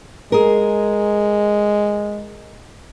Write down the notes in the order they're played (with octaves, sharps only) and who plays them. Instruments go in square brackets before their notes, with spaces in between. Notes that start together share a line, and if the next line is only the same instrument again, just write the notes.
[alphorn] G#3 [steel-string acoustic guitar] G#4 A#4